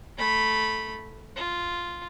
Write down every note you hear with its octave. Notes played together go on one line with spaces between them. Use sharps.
A3 B5
F4